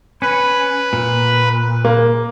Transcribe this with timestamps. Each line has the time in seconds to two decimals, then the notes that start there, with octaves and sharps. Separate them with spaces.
0.22 C#4 B4
0.93 A#2
1.85 A#3